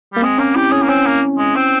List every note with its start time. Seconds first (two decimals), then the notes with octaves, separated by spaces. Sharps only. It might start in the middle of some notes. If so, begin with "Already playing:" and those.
0.13 G3 A#3
0.22 G#3 C4
0.38 A#3 C#4
0.55 E4 G4
0.72 C#4 G#4
0.82 A#3
0.88 C4 C#4
1.06 A#3
1.38 G#3
1.55 C4